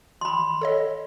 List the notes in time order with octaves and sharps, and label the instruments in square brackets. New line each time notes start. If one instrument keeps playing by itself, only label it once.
[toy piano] B5 C6
[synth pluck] A4 C#5 D#5